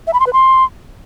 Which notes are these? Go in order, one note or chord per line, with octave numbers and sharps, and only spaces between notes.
E5
B5
C6
B4
C6